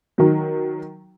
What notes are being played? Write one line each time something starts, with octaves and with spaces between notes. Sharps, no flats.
D#3 F#3